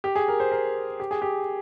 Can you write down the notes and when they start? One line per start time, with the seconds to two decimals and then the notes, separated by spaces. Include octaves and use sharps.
0.04 G4
0.15 G#4
0.28 A#4
0.40 C5
0.52 A#4
1.00 G4
1.11 G#4
1.22 G4